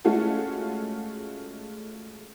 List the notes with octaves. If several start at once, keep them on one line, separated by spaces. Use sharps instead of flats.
G#3 A3 C#4 F4 F#4 A4